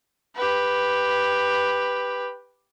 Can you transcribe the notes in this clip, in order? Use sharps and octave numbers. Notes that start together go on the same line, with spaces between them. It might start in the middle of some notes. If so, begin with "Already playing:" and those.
G4 B4